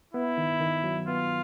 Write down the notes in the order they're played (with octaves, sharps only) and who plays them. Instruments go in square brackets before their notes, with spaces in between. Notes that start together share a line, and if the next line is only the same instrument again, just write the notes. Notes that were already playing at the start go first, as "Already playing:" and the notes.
[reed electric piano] B3 [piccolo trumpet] E4
[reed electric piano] D#3
D#3
F#3
[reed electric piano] B3 [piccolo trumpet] F4